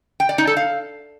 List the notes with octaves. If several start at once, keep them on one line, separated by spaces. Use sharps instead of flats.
G5
D5
D#4
A4
F5